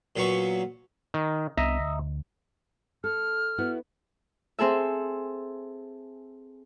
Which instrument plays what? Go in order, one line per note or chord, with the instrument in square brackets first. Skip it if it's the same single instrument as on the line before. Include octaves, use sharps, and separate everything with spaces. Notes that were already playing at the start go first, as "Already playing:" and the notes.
[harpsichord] A#2 F#3 B3 C#6
[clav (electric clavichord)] D#3
[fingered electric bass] C2 B3 D4 [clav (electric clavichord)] D#5 E5 A#5
[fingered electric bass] D2
[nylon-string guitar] A4 [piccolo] F6
[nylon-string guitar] B3 E4 F#4
[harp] C4 G#4 A4 E5